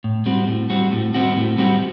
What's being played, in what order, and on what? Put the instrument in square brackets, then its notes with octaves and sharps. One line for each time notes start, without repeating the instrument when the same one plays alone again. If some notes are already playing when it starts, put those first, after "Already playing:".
[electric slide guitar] A2
G3 C4 F#4
A2
G3 C4 F#4
A2
G3 C4 F#4
A2
G3 C4 F#4